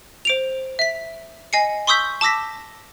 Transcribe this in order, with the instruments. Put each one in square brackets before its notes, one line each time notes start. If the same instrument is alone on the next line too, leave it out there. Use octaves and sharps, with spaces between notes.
[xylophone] C5 D7 F7
E5 B6
D#5 G#5 C7 C#7
C6 C#6 D#6 E6 G6 B6
A5 D6 E6 A#6 B6